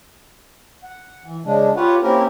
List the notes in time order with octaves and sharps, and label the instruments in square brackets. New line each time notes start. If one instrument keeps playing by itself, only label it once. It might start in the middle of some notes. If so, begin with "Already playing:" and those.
[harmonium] F#5
E3
C#3 G#3 D4
F4 G4 B4 C#5 F#5
A#3 C4 C#4 E4 G4 A#4